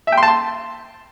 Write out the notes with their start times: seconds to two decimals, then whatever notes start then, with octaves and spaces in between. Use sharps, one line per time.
0.07 E5
0.12 G5
0.17 C6
0.23 A5
0.28 C6